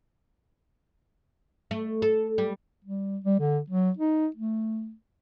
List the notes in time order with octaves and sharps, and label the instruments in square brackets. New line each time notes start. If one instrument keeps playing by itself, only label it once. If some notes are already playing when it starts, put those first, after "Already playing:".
[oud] A3
A4
G3
[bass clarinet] G3
G3
D3
F#3
D#4
A3